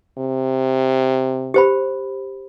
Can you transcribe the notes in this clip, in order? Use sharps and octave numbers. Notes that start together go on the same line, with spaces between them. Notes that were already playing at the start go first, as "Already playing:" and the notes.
C3
G4 C5 B5